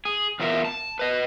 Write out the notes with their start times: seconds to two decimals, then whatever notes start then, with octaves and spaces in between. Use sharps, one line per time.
0.05 G#4
0.40 E2 F4 A#4 E5
0.65 A5
0.99 B4 D#5